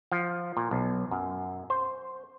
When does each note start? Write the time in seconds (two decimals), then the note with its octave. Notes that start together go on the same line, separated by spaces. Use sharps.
0.12 F3
0.57 A#2
0.71 B1
1.11 F#2
1.70 C5